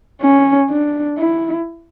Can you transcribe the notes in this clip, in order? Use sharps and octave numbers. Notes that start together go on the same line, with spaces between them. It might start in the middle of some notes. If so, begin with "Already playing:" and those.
C#4
D4
E4